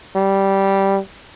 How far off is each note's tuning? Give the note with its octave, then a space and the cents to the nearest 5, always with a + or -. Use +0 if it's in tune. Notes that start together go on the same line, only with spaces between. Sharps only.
G3 -5